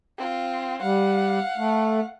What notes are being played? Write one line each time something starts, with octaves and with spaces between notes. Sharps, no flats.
C4 F4
G3 F5 F#5
A3